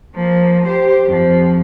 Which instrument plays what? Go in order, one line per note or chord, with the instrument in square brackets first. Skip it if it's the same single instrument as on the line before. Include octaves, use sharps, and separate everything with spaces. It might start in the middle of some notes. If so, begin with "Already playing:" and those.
[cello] F3 A#3
G4 C5
F2 F3